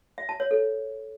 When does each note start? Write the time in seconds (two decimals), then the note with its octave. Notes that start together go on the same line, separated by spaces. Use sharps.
0.18 E5
0.29 A5
0.40 C#5
0.51 A4